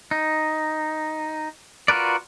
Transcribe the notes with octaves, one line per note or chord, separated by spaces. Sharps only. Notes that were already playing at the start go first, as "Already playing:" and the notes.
D#4
F4 F#4 A#4 B4 D5